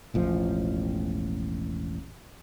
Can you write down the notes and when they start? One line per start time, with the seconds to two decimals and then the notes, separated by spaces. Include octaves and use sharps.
0.14 E1 A1 F3